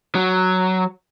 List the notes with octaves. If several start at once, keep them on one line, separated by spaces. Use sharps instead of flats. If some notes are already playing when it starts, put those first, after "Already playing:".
F#3